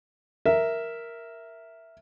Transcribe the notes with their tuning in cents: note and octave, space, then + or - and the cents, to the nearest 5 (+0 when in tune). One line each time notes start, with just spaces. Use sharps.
A#4 +0 E5 +0